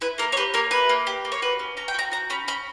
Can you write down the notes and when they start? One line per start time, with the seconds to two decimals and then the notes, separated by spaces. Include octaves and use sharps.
0.01 E4 B4
0.18 A#3 A#4
0.32 C#5
0.37 G4 B4
0.54 A#3 A#4
0.71 E4 B4
0.89 A#3
1.07 G4
1.25 A#3
1.32 C#5
1.42 F#4 B4
1.59 C#4
1.77 C#4 A#5
1.88 G5
1.94 F#4 A#5
2.12 F#4 A#5
2.30 C#4 B5
2.48 C#4 B5